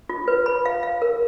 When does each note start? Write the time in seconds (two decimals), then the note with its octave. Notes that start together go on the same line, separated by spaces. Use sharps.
0.09 F4
0.28 B4
0.46 B5
0.65 F5
0.83 F5
1.02 A#4